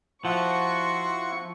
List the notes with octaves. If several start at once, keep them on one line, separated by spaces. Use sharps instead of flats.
F3 E4 F#4 F#5 C6 C#6